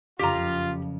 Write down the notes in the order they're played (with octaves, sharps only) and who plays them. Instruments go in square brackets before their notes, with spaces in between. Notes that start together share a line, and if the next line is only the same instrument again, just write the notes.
[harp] F#1 F2 C#3 [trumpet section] F4 [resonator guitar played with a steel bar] G4 A#5